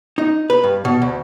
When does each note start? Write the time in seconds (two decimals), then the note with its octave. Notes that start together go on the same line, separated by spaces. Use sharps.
0.18 D#4
0.50 B4
0.63 G2
0.85 B2
1.02 D2